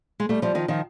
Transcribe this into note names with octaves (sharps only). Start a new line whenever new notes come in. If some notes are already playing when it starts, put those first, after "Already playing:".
G#3
G3 A3
F3 G3
D#3 F3
D#3 F3